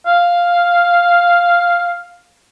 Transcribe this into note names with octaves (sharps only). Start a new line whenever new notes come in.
F5